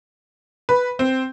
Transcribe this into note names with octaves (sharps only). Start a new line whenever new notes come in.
B4
C4